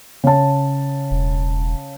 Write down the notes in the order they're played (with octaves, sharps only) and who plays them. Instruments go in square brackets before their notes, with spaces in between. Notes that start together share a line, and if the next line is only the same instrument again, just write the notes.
[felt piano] C#3 A5
[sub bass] E1